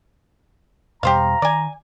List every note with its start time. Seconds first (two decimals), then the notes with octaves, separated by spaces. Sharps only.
1.03 E2 B2 G3 G4 C5 F5 A#5
1.42 D#3 D5 G#5